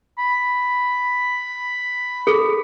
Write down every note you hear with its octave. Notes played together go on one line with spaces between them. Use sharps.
B5
G#4 A4